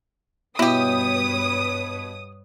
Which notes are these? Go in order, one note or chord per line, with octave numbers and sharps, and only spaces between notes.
G2 B2 E4 G4 B4 C#5 D#6